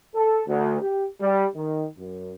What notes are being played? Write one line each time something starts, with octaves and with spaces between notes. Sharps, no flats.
A4
D2
G4
G3
D#3
F#2